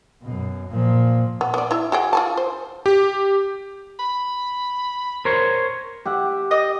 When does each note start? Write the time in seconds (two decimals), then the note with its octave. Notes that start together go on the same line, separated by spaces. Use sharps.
0.23 F#2 B2
0.69 A#2 F3
1.41 B3
1.54 B3 D5
1.71 E4 E5
1.92 F#4 G#4 G5
2.13 F4 G#5 A5
2.37 C5
2.86 G4
3.99 B5
5.25 A#4 C5 C#5
6.05 G4 E5 F#5
6.51 D#5